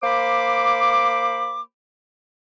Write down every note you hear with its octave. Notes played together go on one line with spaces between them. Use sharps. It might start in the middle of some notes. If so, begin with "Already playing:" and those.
A#3 C5 B5 D6